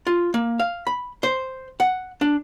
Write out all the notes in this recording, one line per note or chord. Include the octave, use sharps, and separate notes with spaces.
F4
A#3
F5
B5
C5
F#5
D4